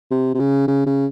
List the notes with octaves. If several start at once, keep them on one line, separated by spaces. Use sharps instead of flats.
C3
C3
C#3
C#3
C#3